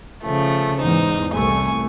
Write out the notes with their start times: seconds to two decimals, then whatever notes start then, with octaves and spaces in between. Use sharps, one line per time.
0.23 C#3 F3 A3
0.81 E2 G#2 D#4 C5
1.34 C2 A3 G#5 C#6